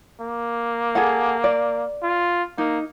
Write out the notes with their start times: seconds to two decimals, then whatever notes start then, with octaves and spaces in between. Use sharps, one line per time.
0.21 A#3
0.95 G#4 A4 F#5
1.44 D5
2.03 F4
2.58 A#3 D#4